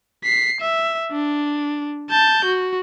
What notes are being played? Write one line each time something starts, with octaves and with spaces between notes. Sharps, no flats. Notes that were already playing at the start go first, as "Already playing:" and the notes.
B6 C7
E5
D4
A5 G6
F#4